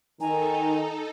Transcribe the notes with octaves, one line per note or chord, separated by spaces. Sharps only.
D#3 D#4 A4 G#5 A#5